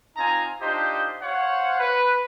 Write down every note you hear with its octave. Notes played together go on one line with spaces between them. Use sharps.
C4 D#4 F4 G#5 A#5
D4 D#4 F4 G4 C5 D#5
C5 C#5 F5 F#5
B4